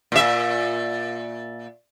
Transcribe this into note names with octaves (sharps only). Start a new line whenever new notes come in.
A#2 E5